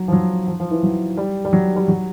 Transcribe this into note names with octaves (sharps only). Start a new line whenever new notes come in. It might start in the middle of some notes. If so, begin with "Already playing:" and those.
Already playing: F#3
F3
F#3
F3
F3
E3
F#3
G3
G3
F#3
G3
F#3